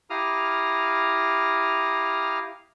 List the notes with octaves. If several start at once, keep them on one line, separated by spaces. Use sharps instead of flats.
E4 G4 F5 A#5 D#6 F6